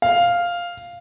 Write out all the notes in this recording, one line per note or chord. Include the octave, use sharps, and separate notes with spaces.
F5